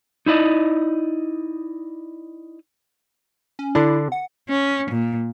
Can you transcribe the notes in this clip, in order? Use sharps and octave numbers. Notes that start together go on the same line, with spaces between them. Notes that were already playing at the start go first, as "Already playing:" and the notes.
D#4 E4 D5 D#5
C#4
D3 D4 E4
F#5
C#4
A#2